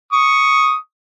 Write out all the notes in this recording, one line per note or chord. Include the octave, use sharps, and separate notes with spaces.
C#6 D#6